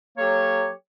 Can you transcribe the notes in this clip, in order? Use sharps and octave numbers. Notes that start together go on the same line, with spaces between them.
F#3 A#3 G4 A4 C#5